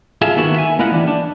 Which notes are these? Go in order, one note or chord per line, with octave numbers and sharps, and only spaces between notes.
F4 G#4 A4 E5
D#3 A#3 B3 E4 F#4
E5 G#5
A#3 E4 F4 D#5 F#5
E3 G3 D4
D4